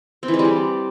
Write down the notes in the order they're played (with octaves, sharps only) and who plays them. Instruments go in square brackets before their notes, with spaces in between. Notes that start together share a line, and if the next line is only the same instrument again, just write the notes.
[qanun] C4
E3
G#3
G3
D4